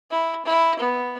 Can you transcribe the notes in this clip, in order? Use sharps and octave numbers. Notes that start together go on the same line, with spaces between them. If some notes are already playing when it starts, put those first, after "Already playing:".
E4
E4
B3